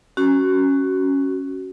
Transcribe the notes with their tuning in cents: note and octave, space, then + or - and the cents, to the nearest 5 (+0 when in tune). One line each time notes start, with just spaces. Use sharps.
C#4 +0 F#4 +15